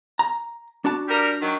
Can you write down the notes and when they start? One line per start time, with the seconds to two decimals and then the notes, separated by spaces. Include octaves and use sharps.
0.19 A#5
0.85 D4 F#4 A5
1.08 G3 A#4
1.42 D#3 F#3